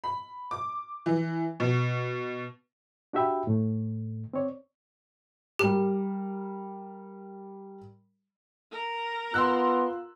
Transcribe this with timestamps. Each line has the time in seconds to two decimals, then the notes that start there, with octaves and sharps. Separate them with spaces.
0.04 B5
0.51 D6
1.06 E3
1.60 B2
3.13 D4 F#4 G4 E5 G5 B5
3.47 A2 A3
4.33 C4 C#5 D5
5.59 G3 G4 A#4
8.71 A#4
9.34 B3 F4 C6 E6 F#6